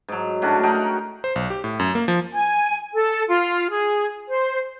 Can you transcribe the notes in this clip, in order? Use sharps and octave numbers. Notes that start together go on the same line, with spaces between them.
G#2 F#3
A2 C#4 D4 F#4
D#4 F#4 A#4 G5
C5
B1
G4
A2
F#2
A#3
F3
G#5
A4
F4
G#4
C5